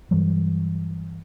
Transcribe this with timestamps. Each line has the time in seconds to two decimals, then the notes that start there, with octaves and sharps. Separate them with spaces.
0.11 G2 E3 F#3 G3